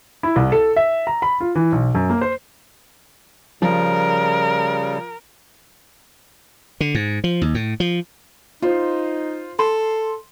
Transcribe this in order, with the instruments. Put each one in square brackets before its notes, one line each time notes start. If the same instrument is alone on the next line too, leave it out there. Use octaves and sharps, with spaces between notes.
[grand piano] E4
C2
A4
E5
A#5
B5
F4
E3
B1
F#2
A#3
C5
[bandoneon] C#3 G3 [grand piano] F3 [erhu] A#4
[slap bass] D3
G#2
F3
D#2
A2
F3
[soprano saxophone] D#4 [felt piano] F4 C5
[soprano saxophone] A4 [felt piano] C6